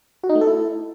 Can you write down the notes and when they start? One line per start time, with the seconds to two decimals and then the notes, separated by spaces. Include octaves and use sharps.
0.23 F#4
0.29 D#4
0.35 A3
0.41 A4
0.47 E4